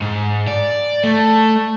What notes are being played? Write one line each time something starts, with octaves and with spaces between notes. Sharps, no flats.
G#2
D5
A3